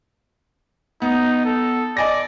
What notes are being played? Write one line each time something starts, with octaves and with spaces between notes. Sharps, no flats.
B3 D#4
A4
D5 D#5 G#5 A#6